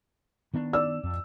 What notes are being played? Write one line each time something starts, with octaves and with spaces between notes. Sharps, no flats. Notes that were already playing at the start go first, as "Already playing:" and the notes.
D#3 B3 D4
D5 E6
F2